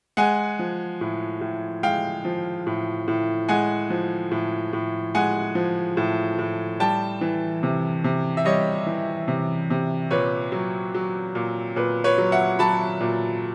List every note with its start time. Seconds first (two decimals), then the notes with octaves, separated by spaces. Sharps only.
0.17 G#3 F#5 G#5
0.59 F3
1.01 A2
1.41 A2
1.83 G#3 F5 G5
2.25 F3
2.67 A2
3.08 A2
3.48 G#3 F#5 G#5
3.90 F3
4.31 A2
4.73 A2
5.15 G#3 F#5 G#5
5.55 F3
5.97 A2
6.39 A2
6.80 G3 G5 A5
7.21 E3
7.63 C3
8.04 C3
8.37 E5
8.45 G3 C#5 D#5
8.86 E3
9.28 C3
9.70 C3
10.11 A#2 B4 C#5
10.52 F#3
10.94 F#3
11.35 A#2
11.76 A#2 B4
12.04 B4 C#5
12.18 F#3
12.32 E5 F#5
12.59 F#3 A5 B5
13.01 A#2